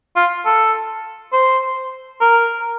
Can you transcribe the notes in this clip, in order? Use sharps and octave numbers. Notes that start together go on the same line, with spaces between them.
F4
A4
C5
A#4